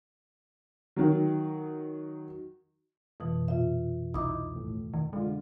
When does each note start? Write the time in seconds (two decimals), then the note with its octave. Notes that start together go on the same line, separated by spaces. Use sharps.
0.96 D#3 F#3
3.20 F2 B2 E3
3.48 A#2 F4 E5
4.14 C2 D#4 E4 D6 D#6
4.53 D#2 A2
4.94 D#3
5.13 D3 G#3 F4